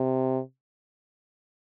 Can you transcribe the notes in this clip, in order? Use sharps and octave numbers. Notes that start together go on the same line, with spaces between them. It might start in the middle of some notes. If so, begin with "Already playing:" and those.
Already playing: C3